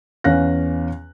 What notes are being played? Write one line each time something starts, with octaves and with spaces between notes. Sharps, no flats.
E2 C#4 F5 F#6 A#6